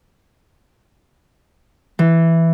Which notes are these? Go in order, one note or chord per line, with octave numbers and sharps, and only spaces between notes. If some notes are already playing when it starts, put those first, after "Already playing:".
E3